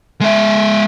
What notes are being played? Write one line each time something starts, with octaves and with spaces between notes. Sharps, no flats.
G#3 E5